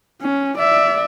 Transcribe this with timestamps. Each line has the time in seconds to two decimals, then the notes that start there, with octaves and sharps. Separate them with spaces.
0.22 C#4
0.58 D5 E5